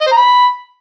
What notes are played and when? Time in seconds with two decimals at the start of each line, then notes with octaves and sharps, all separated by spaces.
0.01 D#5
0.07 C5
0.12 A#5
0.17 B5